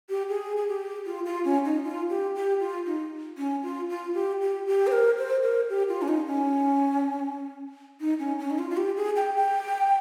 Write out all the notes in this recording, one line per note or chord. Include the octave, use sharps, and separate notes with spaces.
G4
G#4
G#4
G4
F4
F4
C#4
D#4
F4
G4
G4
F4
D#4
C#4
F4
F4
G4
G4
G4
C5
A#4
C5
A#4
G4
F4
C#4
D#4
C#4
D#4
C#4
C#4
D#4
F4
F4
G4
G#4
G5
G5